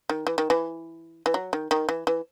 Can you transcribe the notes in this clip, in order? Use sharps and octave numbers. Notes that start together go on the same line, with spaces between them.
D#3
E3
D#3
E3
E3
F#3
D#3
D#3
E3
E3